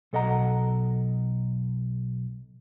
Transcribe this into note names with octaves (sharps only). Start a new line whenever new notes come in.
B1 A4 D#5 F#5 A#5